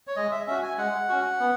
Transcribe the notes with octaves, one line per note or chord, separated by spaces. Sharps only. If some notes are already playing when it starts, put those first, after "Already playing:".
C#5
G#3 D#5
E5
C#4 F#4 E5
G#5
G#3 F#5
C#4 F#4
B3